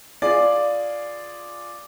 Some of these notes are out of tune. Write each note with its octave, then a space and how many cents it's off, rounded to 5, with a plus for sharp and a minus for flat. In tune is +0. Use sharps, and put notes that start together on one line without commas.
F4 +0 G#4 +0 D5 +0